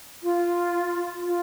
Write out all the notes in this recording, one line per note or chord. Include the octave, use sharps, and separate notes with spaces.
F4
F4